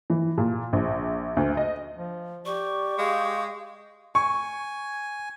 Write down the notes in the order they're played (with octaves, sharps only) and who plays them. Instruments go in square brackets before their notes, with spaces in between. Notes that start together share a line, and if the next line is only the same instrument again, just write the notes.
[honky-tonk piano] E3
A#2
A#1
D2
D#5
[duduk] F3
[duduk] G4 [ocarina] D5 [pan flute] C#6
[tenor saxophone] G#3 [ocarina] F5
[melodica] G#5 [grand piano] C#6